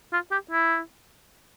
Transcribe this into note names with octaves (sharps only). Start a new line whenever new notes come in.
F4
G4
E4